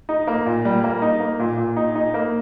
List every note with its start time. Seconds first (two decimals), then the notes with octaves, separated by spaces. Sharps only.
0.09 D#4
0.27 A#3
0.46 A#2
0.65 G3
0.84 A#3
1.02 D#4
1.20 A#3
1.40 A#2
1.57 A#2
1.76 D#4
1.95 D#4
2.14 A#3